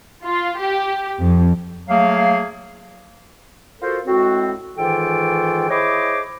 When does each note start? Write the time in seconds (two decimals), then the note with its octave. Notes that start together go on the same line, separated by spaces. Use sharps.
0.23 F4
0.60 G4
1.21 F2
1.89 F#3 A3 A#3 G#4 F5
3.81 F4 F#4 A4 A#4 C5
4.06 A2 G#3 C4 F#4
4.76 G#2 D#3 E3 F4 A4 G5
5.69 E4 G#4 C5 C#5 D#5 D6